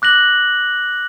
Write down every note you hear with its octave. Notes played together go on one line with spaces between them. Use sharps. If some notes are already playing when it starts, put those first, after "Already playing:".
D6 F#6 A#6 F#7